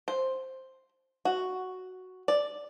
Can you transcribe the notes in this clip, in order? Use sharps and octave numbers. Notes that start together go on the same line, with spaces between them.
C5
F#4
D5